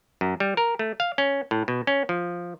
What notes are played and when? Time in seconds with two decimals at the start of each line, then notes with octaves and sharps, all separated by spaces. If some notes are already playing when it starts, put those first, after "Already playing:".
0.21 F#2
0.40 G3
0.57 A#4
0.79 A3
1.00 F5
1.18 C#4
1.51 A2
1.68 B2
1.87 C#4
2.09 F3